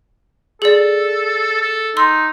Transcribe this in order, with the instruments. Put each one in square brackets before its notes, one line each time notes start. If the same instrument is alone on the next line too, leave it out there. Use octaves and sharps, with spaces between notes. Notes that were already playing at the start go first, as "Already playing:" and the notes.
[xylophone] G#4 D5 [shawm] A4
[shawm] A4
[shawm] D#4 [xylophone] C6 E6